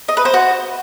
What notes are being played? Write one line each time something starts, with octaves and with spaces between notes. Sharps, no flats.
D#5
B4
C5
F#4